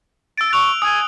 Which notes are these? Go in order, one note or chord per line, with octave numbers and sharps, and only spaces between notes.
E6 A6 D7
C#6 F#6 F7
G#5 D#6